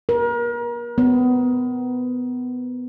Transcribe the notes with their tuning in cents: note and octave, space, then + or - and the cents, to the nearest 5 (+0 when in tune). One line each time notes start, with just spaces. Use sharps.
A#4 +35
B3 +20